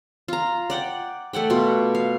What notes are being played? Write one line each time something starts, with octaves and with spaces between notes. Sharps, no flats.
F4 A#5
D5 F#5 G5
A3 D5 F#5 G5
B2 F4
F5